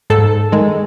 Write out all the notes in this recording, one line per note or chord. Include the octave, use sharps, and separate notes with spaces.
G#2 A4
D#3 G#3